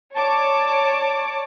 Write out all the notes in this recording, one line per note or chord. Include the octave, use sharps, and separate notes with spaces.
C#5 D5 A5 D6